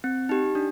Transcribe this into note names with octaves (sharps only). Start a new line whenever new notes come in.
C4
D#4 G4
D4